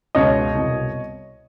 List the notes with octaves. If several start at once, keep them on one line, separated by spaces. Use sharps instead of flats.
C#2 B2 C#5 D#5
C2
B2